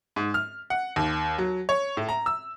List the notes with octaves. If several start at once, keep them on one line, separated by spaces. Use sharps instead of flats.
G#2
F6
F#5
D#2
F#3
C#5
A2
A#5
E6